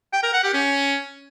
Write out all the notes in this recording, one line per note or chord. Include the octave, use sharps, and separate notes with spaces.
G5
A#4
F#5
G4
C#4